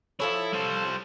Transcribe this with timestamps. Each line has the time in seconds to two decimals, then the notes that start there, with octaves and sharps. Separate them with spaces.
0.20 F3 E4 A4 C#5
0.52 G3 C5